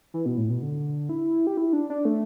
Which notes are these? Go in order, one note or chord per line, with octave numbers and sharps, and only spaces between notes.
E3
B2
A2
B2
D3
E4
G4
E4
D4
D4
A3